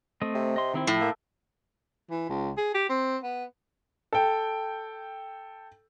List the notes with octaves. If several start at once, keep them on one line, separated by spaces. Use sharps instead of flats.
A3 C4 D#5
C3
D#5 C6
D#3 C4 E4
A2 F3
A#3 E5
E3
C#2
G#4
G4
C4
B3
A4 G5